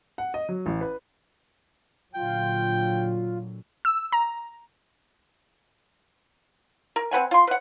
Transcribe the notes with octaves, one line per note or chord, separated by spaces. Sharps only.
F#5
D#5
F#3
A1
B4
A#2 D3 F#3 F4 G5
E6
A#5
A#4
C4 B4 F#5 G#5
F4 C6
B4 F#5